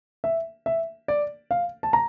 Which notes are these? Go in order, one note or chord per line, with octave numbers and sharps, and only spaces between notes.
E5
E5
D5
F5
A5
A#5